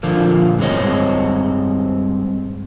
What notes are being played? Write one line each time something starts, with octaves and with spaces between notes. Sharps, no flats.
A#2 D3 F3 A#3
G2 G#3 C4 C#5 D#5